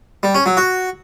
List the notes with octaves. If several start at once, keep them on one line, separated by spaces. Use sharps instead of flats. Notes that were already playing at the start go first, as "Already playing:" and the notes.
G3
C#4
F#3
F#4